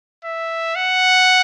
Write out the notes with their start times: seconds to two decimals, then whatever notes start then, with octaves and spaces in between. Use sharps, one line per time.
0.25 E5
0.76 F#5